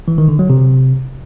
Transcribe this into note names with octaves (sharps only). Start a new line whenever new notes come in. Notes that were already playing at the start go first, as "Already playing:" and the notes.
E3
D#3
D3
F#3
C3